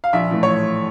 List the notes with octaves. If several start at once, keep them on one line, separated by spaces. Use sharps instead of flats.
F5
A#1 E5
A2 E3 A3
C#5